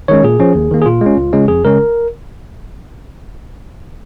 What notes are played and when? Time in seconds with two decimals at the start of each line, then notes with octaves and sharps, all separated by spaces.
0.08 D#3 G#3 C#4 C#5
0.23 A#2 G#4
0.39 F3 C#4
0.55 D#2
0.71 D#3 A#3
0.82 G#4
0.86 A#2 F4
1.01 G#3
1.06 C#4
1.17 C#2
1.33 C#3 G#3 C#4
1.48 F2 G#4
1.65 C#3 G#3 C#4 A#4